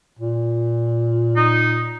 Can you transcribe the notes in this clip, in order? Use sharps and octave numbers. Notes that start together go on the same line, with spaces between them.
A#2
D#4